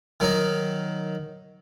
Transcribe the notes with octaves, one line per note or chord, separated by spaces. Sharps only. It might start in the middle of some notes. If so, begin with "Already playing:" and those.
D#3 F#3 D#4